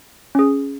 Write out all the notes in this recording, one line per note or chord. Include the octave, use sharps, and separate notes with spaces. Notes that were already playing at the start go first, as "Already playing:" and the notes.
C#4 G#4